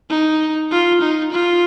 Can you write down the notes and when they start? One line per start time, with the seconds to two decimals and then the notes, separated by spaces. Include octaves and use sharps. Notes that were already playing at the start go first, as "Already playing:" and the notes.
0.10 D#4
0.71 F4
1.01 D#4
1.32 F4